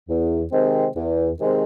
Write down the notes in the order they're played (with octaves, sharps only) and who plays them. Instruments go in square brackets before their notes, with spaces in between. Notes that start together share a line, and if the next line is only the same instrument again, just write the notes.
[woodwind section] E2
C3 D#3 G#3 C4
E2
C3 D#3 G#3 C4